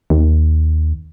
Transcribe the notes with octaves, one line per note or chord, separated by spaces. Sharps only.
D#2